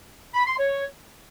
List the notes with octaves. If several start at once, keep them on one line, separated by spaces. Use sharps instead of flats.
B5
C6
C#5